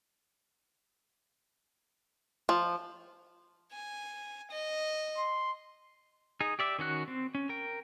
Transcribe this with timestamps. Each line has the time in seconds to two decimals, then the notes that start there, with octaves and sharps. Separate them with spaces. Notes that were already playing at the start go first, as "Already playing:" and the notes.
2.49 F3
3.72 G#5
4.50 D#5
5.18 C6
6.40 D#4 G#4
6.59 G4 D5 E5
6.79 D#3 C#4 F#4 F#6
7.08 C4
7.35 C#4
7.49 A#4 G5